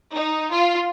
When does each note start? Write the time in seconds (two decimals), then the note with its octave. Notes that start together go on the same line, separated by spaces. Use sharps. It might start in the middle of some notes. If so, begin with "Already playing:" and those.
0.14 D#4
0.52 F4